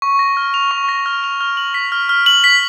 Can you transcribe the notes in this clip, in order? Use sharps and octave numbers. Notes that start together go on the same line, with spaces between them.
C#6
A#6
F6
F7
C#6
A#6
F6
F7
F6
F#7
B6
F6
F6
F#7
B6